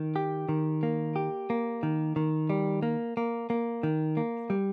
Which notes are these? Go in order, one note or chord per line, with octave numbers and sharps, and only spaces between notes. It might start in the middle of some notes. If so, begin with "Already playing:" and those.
Already playing: D#3
G4
D#3
A#3
G4
A#3
D#3
D#3
G3
A#3
A#3
A#3
D#3
A#3
G3